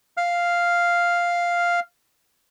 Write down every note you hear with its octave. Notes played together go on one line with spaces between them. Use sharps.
F5 F6